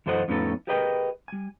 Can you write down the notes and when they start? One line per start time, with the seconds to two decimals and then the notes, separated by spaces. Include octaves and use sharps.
0.06 F#2 E3 A4 C5 D#5 F#5
0.28 F2 A2 B3 C#4 D#4 A4
0.67 G4 G#4 A#4 B4 D#5 G5
1.28 G3 G#5